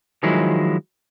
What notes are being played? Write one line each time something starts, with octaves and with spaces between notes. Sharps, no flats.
D#3 F3 F#3 G#3 E4